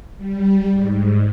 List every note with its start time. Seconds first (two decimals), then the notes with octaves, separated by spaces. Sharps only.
0.17 G3
0.71 G#2